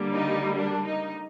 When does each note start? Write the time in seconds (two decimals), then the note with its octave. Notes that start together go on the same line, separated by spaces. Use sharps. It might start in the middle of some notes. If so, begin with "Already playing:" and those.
Already playing: D3 G3 A#3
0.12 D#4
0.55 D4
0.84 D#4